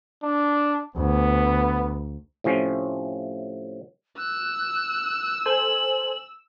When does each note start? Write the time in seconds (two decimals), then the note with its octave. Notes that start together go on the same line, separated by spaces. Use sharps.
0.23 D4
0.96 D2 B3
2.44 A2 C3 F3 C#4
4.18 E6 F#6
5.46 A4 C5 G#5 F#7